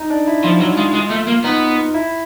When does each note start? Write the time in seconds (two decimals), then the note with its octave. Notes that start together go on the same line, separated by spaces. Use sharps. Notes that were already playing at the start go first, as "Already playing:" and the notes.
Already playing: D#4
0.10 D4
0.27 E4
0.43 F3 F4
0.60 F#3 F#4
0.77 G#3 F4
0.94 G#3
1.10 A3
1.27 A#3
1.44 B3 D#4
1.94 E4